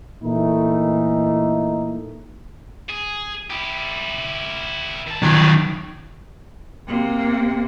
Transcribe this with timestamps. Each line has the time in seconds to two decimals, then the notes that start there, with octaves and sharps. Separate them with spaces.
0.23 A#2 E3 A3 D#4
2.90 G#4
3.50 E4 G4
5.07 D#3 A5
5.22 D#3 F#3 D5
6.87 C3 A#3